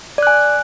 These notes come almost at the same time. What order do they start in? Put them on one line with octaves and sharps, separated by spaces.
D5 F#6 G#5